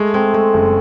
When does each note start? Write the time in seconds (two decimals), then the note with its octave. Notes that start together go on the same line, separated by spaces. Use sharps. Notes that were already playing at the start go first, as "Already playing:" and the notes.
Already playing: G#3 A3
0.14 G#3 C4
0.34 G#3 A3
0.54 F#1